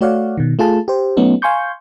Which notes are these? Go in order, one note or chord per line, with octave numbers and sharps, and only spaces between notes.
A3 F#4 C#5 D5 F5 F#5
B2 D#3
A3 F4 G#4 A5
G4 C5
F#3 A3 B3 C#4 D#4
F5 G#5 C6 C#6 G6